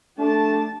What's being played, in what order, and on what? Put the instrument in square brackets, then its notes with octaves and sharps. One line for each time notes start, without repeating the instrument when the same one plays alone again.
[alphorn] A3 [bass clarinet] D4 [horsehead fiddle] G4 A5